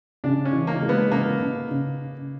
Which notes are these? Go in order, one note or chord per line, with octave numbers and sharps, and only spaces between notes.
C#3 D4
C#4
E3
A#3
G#3
B3
C#3 A#3
C#3
C#3